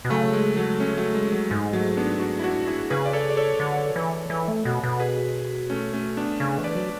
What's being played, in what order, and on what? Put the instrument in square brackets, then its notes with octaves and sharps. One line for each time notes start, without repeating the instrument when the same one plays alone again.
[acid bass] B2
[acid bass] C#3 [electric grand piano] F#3 A3
[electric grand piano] G#3
F#3 A3
A3 C#4
F#3 A3
G#3
F#3
[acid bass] G#2 [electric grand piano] G#3
[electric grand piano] F#3 A3
B3 D4
D4 F#4
E4
D4 F#4
E4 G#4
[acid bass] C#3 [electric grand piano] G#4 B4
[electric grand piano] D5
A4 C#5
D5
A4 C#5
[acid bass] D3
E3
E3
A3
B2
B2
[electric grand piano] G#4 B4
A3 C#4
A3 C#4
B3 D4
[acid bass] C#3
E3
[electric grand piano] B4 D5
[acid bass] F#3